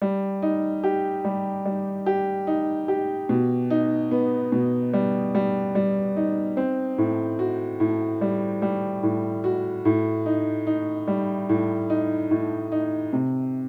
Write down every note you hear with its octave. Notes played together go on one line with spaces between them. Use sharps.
G3
D#4
G4
G3
G3
G4
D#4
G4
B2
D#4
B3
B2
G3
G3
G3
D#4
C4
A2
F#4
A2
G3
G3
A2
F#4
A2
D#4
D#4
G3
A2
D#4
A2
D#4
C3